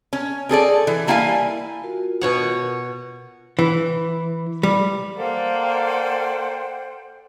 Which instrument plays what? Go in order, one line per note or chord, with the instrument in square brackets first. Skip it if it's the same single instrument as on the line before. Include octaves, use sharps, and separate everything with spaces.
[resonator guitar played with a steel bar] C#4
C4 G#4 A4 D5
E3
G3 A#3 E4 F5 F#5 G#5
[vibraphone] F4 F#4 A#4
[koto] B2 C#5 F#5
[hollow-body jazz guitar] E3
G3
[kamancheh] A#3 [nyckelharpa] A4 D5 [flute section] C5 F#5 G5